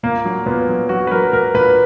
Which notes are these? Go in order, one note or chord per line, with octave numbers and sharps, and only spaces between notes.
A#2 A#3
F#3
A#2 B3
F#3
F#3 F#4
B4
F#3 A#4
A#2 A#4
A#2 B4